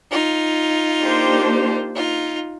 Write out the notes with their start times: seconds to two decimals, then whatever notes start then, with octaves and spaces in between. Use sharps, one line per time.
0.11 D#4 F4
1.03 A#3 D4 G4 C5
1.94 D#4 F4